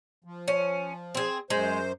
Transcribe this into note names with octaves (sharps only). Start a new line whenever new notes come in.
F3
C#4
C4 G#4
F#2 G#3 C5